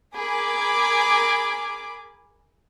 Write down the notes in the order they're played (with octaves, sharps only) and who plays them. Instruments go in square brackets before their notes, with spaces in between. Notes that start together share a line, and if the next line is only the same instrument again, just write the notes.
[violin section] G#4 A#4 G#5 B5 D6